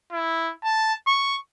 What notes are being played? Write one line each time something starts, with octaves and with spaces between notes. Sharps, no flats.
E4
A5
C#6